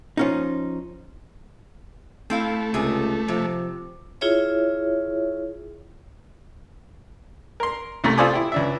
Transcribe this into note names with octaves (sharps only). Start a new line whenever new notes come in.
F3 C#4 D#4
A3 C4 E4 F5
C#2 C3 G#4
C3 F3
E4 F4 G#4 C#5 E5
A#4 C6
C2 C3 A3 A#5
F4 A4 C5 D5 G#5 D#6
E4 G4
C#2 D4 E5